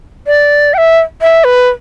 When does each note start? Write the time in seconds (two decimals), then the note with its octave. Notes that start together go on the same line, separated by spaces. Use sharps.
0.27 D5
0.74 G5
0.78 E5
1.22 E5
1.44 B4